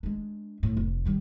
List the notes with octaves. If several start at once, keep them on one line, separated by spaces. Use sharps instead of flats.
G#3 D4
A2
F1
D#3 G3